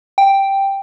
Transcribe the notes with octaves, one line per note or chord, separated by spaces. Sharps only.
G5